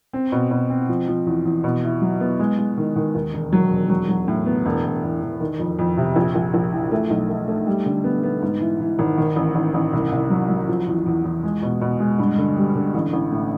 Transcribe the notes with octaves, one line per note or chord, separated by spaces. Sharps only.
C4
B2
B2
C4
F3
F3
E2
E2
B2
E4
F#3
B3
G#3
G#3
D#3
D#3
D#2
E1
F#3
E1
F#3
F#3
A2
B3
E1
E1
E1
E1
D#3
F2
F2
C3
A#1
A#1
A#1
E3
A3
B1
A3
A3
G3
D3
B3
B3
G#2
E3
E3
G#1
D#3
A1
A1
A1
C2
C2
F#3
F#3
F3
E2
E2
E2
G#3
B2
B2
G#3
G2
D3
G3
D3
A1
A1
A2